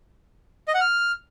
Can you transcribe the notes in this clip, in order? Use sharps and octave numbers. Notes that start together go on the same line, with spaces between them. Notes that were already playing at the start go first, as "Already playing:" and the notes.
D#5
F#5
F6